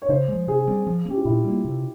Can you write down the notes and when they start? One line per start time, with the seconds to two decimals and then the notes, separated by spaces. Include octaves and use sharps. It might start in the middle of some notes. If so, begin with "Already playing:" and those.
0.02 C#5
0.09 C#3 C5
0.28 F3 G#3
0.47 C3 G#4
0.67 G3 C4
0.87 F3
1.05 A#3
1.08 C#4 G4
1.17 F4
1.25 A#2 E4
1.44 G3 A#3
1.65 C3